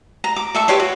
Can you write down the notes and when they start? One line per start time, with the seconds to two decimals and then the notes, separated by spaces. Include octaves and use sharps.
0.24 A#5
0.36 D6
0.55 A4 E5 C#6
0.68 G4 B4 C#5 C6
0.80 F#4